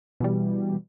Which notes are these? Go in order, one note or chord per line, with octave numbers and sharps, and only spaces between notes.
B2 E3 G3